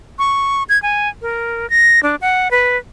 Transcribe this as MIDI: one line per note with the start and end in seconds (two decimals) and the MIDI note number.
0.19 0.63 85
0.69 0.81 92
0.83 1.09 80
1.22 1.69 70
1.70 2.00 94
2.03 2.16 62
2.21 2.51 78
2.51 2.77 71